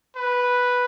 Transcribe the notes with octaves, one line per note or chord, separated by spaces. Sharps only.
B4